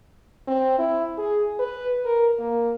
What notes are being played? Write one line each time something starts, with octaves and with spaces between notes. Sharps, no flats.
C4
E4
G#4
B4
A#4
A#3